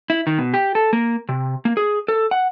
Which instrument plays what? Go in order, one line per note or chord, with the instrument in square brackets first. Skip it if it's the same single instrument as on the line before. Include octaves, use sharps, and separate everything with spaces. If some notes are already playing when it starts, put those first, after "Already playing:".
[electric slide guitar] E4
D#3
B2
G4
A4
A#3
C3
A#3
G#4
A4
F#5